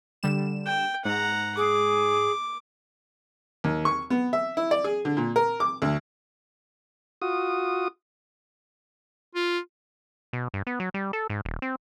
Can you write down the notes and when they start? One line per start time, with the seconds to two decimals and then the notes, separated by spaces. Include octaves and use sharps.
0.23 D3 G3 E7
0.66 G5
1.05 G#2 F#5 A#5
1.57 G#4 D6
3.64 D#2
3.85 C#6
4.10 B3
4.33 E5
4.57 E4
4.71 D5
4.84 G#4
5.05 D3
5.17 A#2
5.36 A#4
5.60 D6
5.82 D2
7.22 F4 F#4 D#6
9.35 F4
10.33 B2
10.54 G2
10.67 B3
10.80 F#3
10.94 G3
11.13 A4
11.30 G#2
11.45 D#1
11.62 C4